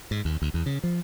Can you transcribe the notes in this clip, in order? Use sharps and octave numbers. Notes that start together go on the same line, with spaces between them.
G#2
D#2
D2
E2
C#3
F3